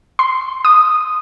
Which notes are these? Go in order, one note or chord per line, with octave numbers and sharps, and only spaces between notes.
C6
D#6